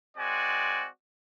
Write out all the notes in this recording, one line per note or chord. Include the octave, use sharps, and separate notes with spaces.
G#3 C4 F#4 D5 G#5